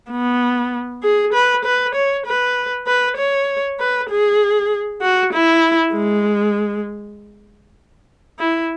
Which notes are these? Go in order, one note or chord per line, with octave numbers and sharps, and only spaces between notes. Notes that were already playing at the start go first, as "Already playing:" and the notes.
B3
G#4
B4
B4
C#5
B4
B4
C#5
B4
G#4
F#4
E4
G#3
E4